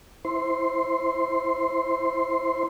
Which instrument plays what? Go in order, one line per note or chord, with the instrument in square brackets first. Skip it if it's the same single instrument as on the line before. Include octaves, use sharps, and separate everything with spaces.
[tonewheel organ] E4 C5 C6